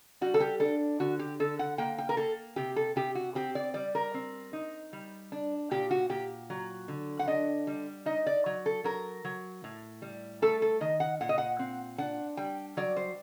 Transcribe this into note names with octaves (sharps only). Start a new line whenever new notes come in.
G3 F#4
A4
G4
D4 A4
D3 F#4
G4
D3 A4
F#5
A#3 G5
G5
A#4
A#3 A4
C3 G4
A4
C3 G4
F#4
C4 G4
D5
G3 D5
A#4
C4
D#4
G3
D4
A#2 G4
F#4
A#2 G4
F#3
D3
F#5
D4 D#5
G3
D#4 D#5
D5
F#3
A4
F#3 A#4
F#3
A2
G3
A3 A4
A4
D#3 D#5
F#5
A#2 F#5
D#5
F#5
C4
D4 F#5
G3 G5
F#3 D5
C5